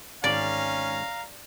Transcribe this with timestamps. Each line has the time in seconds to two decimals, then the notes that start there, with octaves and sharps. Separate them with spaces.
0.24 G#1 G#2 C#4 D5 F5 A#5